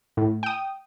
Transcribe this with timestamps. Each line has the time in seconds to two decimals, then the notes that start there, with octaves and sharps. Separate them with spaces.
0.17 A2
0.43 G5 D#6